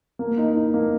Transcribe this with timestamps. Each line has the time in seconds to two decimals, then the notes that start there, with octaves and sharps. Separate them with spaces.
0.19 A#3
0.38 D#4
0.56 D#4
0.74 A#3